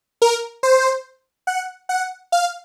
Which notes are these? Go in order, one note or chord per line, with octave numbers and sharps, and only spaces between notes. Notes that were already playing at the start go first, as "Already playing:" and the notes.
A#4
C5
F#5
F#5
F5